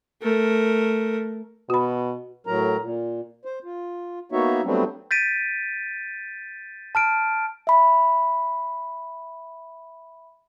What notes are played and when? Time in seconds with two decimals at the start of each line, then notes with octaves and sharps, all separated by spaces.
0.22 A3 A#4
1.70 B2 F#4 B5
2.47 A2 F#3 A#4 A#5
2.81 A#2
3.45 C5
3.64 F4
4.32 A#3 B3 D#4 F#4 C#5 E5
4.65 F#3 G3 A3 B3 C4 D4
5.11 G6 A6 B6 D7 D#7
6.95 A5 F6 D7
7.67 E5 B5